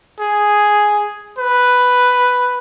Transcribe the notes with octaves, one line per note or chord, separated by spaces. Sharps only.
G#4
B4